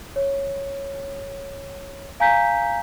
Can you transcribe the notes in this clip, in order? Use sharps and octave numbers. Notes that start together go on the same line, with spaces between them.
C#5
F5 G#5 A#5 G6 B6